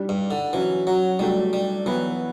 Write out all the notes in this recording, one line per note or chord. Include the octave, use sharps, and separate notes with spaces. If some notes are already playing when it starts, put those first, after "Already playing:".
Already playing: G3 D4 G4
G2
D3
E3 F#3 C#4 F#4
F#3
F#3 G3 A3 D4 G4
G3
E3 F#3 B3 F#4